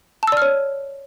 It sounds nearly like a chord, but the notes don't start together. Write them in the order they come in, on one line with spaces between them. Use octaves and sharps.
A5 E6 D5 F6 C#5